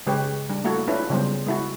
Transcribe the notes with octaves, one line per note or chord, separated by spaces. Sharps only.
C#3 G#3 G4 B4 C#5
G3 D4
A3 A#3 E4 F#4 A4
C#4 D4 E4 F4 B4
C#3 F#3 G3 B3 C#4 C5
G#3 E4 F#4